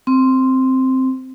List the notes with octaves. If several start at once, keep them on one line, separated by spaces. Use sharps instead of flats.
C4